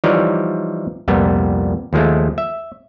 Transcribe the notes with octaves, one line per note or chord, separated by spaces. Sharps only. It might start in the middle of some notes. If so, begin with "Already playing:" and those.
E3 F3 G3 D#4 C#5 D5
C2 F2 A#2 G3 B3
D#2 F3 G#3 A3
E5